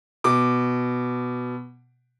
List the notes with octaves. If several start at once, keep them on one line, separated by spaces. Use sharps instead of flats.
B2 D6